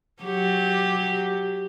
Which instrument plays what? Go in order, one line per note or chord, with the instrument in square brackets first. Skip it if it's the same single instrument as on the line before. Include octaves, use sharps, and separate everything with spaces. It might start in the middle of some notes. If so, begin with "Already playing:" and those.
[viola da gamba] F#3 G4